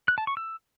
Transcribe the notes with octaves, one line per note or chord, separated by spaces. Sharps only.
F#6
A5
C#6
E6